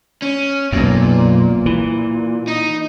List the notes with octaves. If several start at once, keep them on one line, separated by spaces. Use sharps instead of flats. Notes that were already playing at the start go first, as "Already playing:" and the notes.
C#4
B1 F#2 A#2
E3
D#4